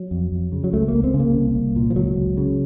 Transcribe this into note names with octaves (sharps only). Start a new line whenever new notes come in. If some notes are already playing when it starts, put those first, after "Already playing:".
Already playing: F#3
F2
F2
C#3
F#3
C#2 A3
C#2 A#3
C4
C#3
A#3
C2
C2
A#2
F3
C#2 F#3
C#2
C#3